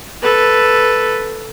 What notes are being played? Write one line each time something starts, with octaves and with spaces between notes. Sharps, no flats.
A4 B4